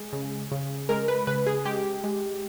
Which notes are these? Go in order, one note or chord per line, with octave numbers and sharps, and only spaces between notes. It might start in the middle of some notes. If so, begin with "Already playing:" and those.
Already playing: G#3 G#4
C#3
C#3
G#3 A#4
B4
C#3 B4
G#4
G#3 G4
G#3